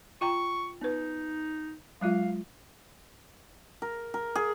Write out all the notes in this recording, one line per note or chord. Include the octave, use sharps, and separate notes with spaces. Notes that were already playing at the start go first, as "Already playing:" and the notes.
F4 G5 A#5 C#6
B3 D#4 B4
F#3 G#3 F4 F5
A#4
A#4
G#4